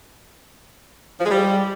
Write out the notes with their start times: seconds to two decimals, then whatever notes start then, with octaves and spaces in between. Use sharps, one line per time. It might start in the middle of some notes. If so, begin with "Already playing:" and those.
1.20 F3
1.25 G#3
1.31 G3